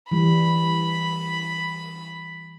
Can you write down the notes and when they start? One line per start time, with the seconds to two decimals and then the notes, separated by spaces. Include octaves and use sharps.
0.11 E3 G3 B5